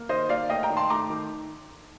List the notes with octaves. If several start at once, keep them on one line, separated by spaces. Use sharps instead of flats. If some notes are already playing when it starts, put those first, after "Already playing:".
Already playing: A#3
D#3 C5 D#5
A#3 D5 F5
A3 D#5 G5
G5 A#5
D#3
A5 C6
A3 A#5 D6
D#3